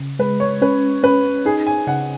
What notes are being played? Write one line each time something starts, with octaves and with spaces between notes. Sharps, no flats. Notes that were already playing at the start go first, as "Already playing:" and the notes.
Already playing: C#3
G#3 B4
C#5
C#4 B4
C#4 B4
D#4 G#4
G#5
C#3 F#5